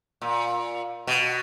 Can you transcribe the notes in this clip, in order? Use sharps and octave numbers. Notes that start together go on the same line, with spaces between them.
A#2
B2